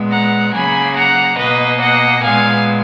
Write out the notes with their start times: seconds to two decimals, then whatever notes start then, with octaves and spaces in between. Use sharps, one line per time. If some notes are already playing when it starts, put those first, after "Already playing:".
Already playing: A#2 G#3 B3
0.11 F#5 A#5
0.54 C#3 F#3 A#3 G#5 B5
0.96 F#5 A#5
1.38 B2 A#3 B4 D#5
1.81 D#5 F#5
2.23 A#2 G#3 B3 F5 G#5